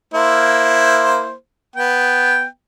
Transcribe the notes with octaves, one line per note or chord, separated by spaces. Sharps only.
A#3 E4 C5
B3 G5